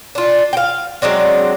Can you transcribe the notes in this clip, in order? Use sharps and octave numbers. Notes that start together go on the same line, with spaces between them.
D4 F4
F5 G5
F#3 G#3 C4 D4